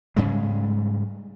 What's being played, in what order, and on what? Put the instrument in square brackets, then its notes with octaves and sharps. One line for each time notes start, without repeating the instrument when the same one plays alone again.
[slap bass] G#2 C#3 G3 G#3